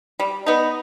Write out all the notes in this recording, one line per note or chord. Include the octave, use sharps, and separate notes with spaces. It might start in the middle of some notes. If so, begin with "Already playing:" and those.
G3
B3 D#4